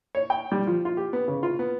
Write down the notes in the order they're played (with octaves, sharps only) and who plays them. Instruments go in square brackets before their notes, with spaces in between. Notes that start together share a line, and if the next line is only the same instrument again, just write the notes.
[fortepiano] C#5
G5
G3
F3
F4
G4
B3
C#3
F4
B3